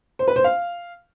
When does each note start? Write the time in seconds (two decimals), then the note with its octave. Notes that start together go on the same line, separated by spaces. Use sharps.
0.19 C5
0.28 B4
0.36 C5
0.44 F5